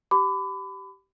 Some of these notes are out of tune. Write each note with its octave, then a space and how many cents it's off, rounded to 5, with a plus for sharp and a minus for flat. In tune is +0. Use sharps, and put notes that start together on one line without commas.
G4 -20 B5 +30 D6 +0